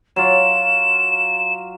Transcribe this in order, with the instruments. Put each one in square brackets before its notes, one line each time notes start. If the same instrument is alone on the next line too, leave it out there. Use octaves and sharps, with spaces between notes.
[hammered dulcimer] F#3 F4 [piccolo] E7